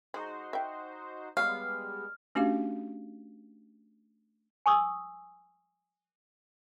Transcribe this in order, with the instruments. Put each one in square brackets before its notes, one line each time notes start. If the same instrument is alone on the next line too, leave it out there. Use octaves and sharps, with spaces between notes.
[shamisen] G#3 [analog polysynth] D#4 F#4 C5
[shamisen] E5 G5
[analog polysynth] G3 G#3 B3 [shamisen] C#5 [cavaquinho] F5 [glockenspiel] F6
[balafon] A3 C#4 D4 F#4 G4 F5
[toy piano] G#5 C#6 D#6 E6